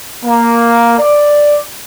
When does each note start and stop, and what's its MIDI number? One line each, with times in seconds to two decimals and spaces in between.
0.25 0.97 58
0.98 1.59 74